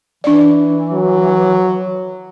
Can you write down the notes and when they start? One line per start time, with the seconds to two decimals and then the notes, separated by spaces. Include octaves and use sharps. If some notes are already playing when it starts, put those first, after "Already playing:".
0.24 E3 D4 D5
0.93 F#3